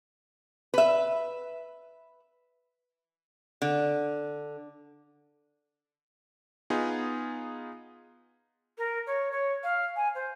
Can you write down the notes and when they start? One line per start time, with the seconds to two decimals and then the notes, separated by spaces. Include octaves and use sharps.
0.74 B4 E5
3.62 D3
6.70 B3 D#4 F4 G#4
8.78 A#4
9.07 C#5
9.32 C#5
9.63 F5
9.96 G#5
10.15 C5